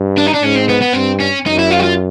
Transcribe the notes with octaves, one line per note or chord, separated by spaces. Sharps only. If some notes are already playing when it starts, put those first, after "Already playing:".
Already playing: G2
D4
D#4
D4
G#2 C#4
C4
B3
B3
G2 C4
C#4
F#2 D#4
E4
F4
F#4
F4